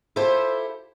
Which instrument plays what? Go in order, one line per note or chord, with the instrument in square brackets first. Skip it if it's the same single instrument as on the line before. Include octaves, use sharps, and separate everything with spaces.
[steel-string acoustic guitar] E4 F4 G4 A4 C5